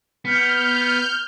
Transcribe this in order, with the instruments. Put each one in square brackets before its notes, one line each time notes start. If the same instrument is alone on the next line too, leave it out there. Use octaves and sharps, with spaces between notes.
[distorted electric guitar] B3 [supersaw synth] F6 G6